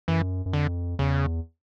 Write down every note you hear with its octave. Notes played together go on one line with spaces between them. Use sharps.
F#2 E3
F#2
F2 D3
E2 C#3